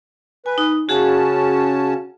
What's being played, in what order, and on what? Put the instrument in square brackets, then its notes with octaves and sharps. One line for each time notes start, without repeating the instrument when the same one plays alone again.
[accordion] B4 [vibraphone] G#5
[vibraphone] D#4
[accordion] C#3 C#4 A5 [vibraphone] F#4 G#4 F#5